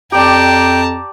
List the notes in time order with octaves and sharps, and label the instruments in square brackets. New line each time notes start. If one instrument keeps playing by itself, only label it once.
[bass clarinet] F2 [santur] G4 D5 [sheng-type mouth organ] G5 [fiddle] A5 A#5